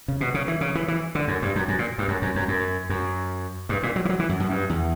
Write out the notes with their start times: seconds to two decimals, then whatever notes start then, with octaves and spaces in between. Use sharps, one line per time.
0.08 C#3
0.21 B2
0.34 C#3
0.48 E3
0.61 C#3
0.75 E3
0.88 E3
1.15 D3
1.28 F#2
1.42 G2
1.55 F#2
1.68 F#2
1.79 A#2
1.98 G2
2.08 F#2
2.22 F#2
2.36 F#2
2.48 F#2
2.89 F#2
3.69 G2
3.83 A#2
3.96 F#3
4.05 E3
4.09 F#3
4.20 E3
4.29 F#2
4.40 F#2
4.50 G2
4.70 E2